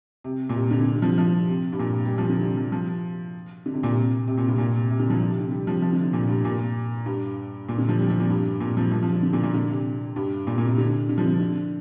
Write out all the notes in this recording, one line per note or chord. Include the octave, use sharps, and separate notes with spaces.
C3
A#2
C3
C3
D3
D3
F3
F3
C3
G2
A#2
G3
F3
D3
C3
F3
F3
D3
C3
A#2
C3
C3
A#2
G2
A#2
C3
C3
D3
F3
C3
C3
D3
G3
F3
F3
D3
C3
A#2
G2
A#2
G2
A#2
D3
F3
G3
F3
A#2
G2
A#2
F3
F3
F3
D3
D3
A#2
A#2
D3
C3
G2
A#2
A#2
C3
D3
D3
F3
D3
D3